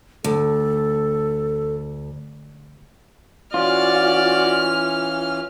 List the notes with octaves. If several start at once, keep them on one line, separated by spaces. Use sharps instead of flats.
D2 A4
E3 C#4 F4 F#4 D5 F6